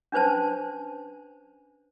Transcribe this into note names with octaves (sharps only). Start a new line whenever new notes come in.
C#4 D4 B4 C5 A5